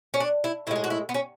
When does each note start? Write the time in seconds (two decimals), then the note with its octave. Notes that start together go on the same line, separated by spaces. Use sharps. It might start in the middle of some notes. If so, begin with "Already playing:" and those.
0.14 C#4
0.20 D4
0.44 E4
0.67 A2 E4
0.71 G#3 G#4
0.84 F#4
0.90 E4
1.09 B3
1.14 C#4